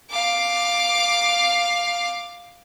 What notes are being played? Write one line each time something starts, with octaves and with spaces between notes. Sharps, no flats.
F5 D6